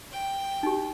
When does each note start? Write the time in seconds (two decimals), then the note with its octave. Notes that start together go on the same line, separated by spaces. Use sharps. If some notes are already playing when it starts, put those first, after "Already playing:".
0.12 G5
0.63 D#4 G4